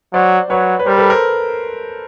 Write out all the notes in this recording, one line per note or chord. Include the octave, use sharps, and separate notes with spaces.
F#3 C5 D5
F#3 B4 C#5
B4
G3 A#4 C5
A4 B4
A#4 C5